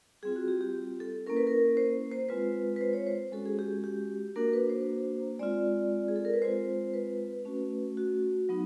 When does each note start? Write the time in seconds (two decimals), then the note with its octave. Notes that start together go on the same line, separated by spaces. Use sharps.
0.23 G3 C4 F4 G#4
0.36 F#4
0.48 G4
0.61 G4
1.00 A4
1.26 A#3 C#4 E4 A#4
1.37 B4
1.47 A#4
1.77 C5
2.11 C5
2.29 G#3 C4 F4 B4
2.76 B4
2.81 C5
2.93 C#5
3.07 C5
3.32 G#3 C#4 F#4 A4
3.46 G#4
3.59 G4
3.84 G4
4.36 A#3 D4 F#4 A#4
4.53 B4
4.69 C5
5.39 G#3 C4 F4 D5
6.08 G#4
6.16 A4
6.25 A#4
6.33 B4
6.41 G#3 C4 F4 C5
6.93 B4
7.45 A3 C#4 F#4
7.97 F#4
8.49 F#3 B3 D#4